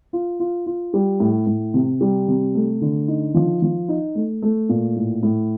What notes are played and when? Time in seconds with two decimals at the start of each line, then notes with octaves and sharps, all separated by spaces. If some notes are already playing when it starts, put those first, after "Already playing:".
0.13 F4
0.40 F4
0.66 F4
0.94 G3
1.20 A2
1.47 A2
1.74 C3
2.01 G3
2.28 C3
2.55 A3
2.81 D3
3.08 D#4
3.34 F3
3.62 F3
3.88 D#4
4.15 A3
4.42 A3
4.69 A#2
4.96 A2
5.23 A2